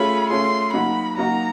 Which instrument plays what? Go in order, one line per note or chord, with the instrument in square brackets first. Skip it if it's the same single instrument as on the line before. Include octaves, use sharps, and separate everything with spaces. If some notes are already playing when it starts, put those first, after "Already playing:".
Already playing: [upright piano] A3 C#4 F4 G#4 [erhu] B5
[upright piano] A3 C#4 F4 G#4 [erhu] C6
[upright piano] F#3 A#3 D#4 F#4 [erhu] B5
[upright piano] F#3 A#3 D#4 F#4 [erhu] A#5